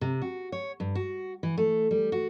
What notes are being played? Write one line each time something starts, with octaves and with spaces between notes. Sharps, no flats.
C3
F#4
C#5
G2
F#4
E3
A3
G3
F#4